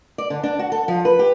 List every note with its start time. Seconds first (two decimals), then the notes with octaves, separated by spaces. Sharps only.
0.18 D5
0.30 D3
0.43 D4
0.59 F#4
0.72 A4
0.88 F3
1.05 B4
1.19 G4